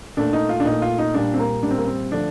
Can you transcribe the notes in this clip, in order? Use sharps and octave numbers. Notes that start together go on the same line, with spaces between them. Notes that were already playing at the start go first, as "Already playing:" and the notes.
A#2 A3 D4
D#4
F4
D4
A#2 A3 D#4
F4
D#4
A#2 G3 A#3 D4
C4
A#3
A#2 G3 A#3 D4
C4
A#3
C4
D3 F3 A3 D4